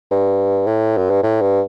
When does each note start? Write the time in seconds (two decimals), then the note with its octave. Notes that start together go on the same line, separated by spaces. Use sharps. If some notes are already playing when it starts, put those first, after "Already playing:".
0.11 G2
0.67 A2
0.97 F#2
1.10 G2
1.23 A2
1.41 G2